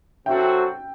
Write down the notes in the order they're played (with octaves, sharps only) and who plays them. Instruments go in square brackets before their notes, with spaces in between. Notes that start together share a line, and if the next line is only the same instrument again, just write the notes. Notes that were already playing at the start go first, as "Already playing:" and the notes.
[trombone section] C3 F#3 C4 F#4 A4 [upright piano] E5 G5